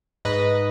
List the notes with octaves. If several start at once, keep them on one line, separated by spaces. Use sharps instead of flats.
G#2 B4 D#5